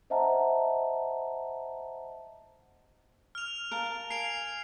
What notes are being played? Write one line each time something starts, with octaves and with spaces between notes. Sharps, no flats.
C5 D#5 E5 F#5 A5 A#5
F6 F7
A#4 F5 A5
G#5 C7 D7 F7